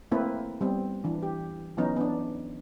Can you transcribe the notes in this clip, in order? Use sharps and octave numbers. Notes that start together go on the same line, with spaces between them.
A3 A#3 C4 E4 B4
G3 B3 C4
E3 D4
G4
E3 F#3 B3 C#4 D#4
B3 D4